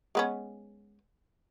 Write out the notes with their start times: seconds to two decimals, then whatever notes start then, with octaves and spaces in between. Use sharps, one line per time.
0.15 G#3 B3 C#4